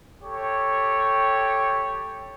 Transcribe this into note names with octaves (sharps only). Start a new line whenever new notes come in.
G4 A4 C#5